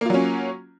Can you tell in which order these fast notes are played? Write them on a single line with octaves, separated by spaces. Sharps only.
A#3 F4 F#3 C#4